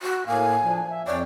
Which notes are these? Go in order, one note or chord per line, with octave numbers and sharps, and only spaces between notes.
F#4
A2 A#3 F5 G#5
F3 D4
E5
F2 C#5 D5 G5